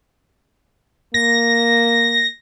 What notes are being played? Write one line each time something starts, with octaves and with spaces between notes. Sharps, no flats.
A#3 A#6